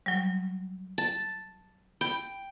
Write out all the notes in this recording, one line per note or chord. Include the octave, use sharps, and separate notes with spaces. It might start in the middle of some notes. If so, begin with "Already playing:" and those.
F#3 G3
A5
G5 B5 G6